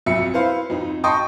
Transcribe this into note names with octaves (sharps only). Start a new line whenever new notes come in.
B1 F2 E5 C#7
E4 B4 C5 F5
F2 D#4
D#5 G5 A5 C6 C#6 D#6